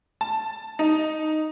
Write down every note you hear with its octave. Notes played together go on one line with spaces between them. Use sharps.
A5
D#4